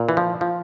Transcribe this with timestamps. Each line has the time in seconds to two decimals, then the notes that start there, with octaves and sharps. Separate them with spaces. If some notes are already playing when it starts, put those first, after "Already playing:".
Already playing: A#2
0.09 E3
0.17 F3
0.41 F3